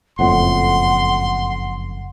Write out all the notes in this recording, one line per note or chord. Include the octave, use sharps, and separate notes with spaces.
F#1 F2 A2 F#5 C6